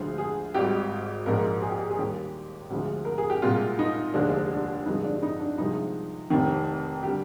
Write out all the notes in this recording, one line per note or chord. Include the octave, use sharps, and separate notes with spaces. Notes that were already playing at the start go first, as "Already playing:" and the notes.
Already playing: D2 D3 F3 G#3 C5
G#4
G#1 G#2 G3 G4
A#1 G#2 F3 G#3 A#4
G#4
G4
G#4
G#4
D#2 D#3 G3 G4
D2 D3 F3 G#3
A#4
G#4
G4
C2 A#2 G#3 F4
D#4
F1 D#2 D3 F3 G#3 D4
D4
G1 G2 D3 F3 G#3 D#4
D4
D4
D#4
D4
C2 C3 F3 G#3 D#4
F1 F2 D#3
D3 G3 G4